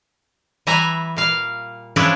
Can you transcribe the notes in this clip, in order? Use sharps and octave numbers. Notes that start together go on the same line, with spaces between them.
E3 G3 E5 G#5 A#5
A#2 F5
E3 F3 C#4 D4 E4